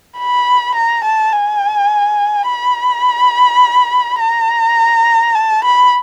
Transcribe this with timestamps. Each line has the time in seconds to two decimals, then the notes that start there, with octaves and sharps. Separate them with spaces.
0.18 B5
0.75 A#5
1.04 A5
1.32 G#5
2.48 B5
4.20 A#5
5.35 A5
5.64 B5